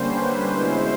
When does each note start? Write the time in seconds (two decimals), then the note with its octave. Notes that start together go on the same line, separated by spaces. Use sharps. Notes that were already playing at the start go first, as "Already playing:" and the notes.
Already playing: D3 G3 A#3 C#4 C5
0.08 B4
0.42 B2 G#3 C#4 E4 C5